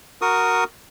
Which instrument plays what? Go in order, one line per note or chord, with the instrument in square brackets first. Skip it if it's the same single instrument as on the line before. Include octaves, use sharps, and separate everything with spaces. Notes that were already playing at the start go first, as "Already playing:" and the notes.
[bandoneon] F#4 A#4 C#6 D#6